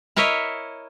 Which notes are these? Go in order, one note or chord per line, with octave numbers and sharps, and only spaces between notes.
E4 A#4 C#5 D#5 E5